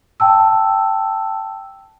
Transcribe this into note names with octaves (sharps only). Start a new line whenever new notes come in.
G5 A5 E6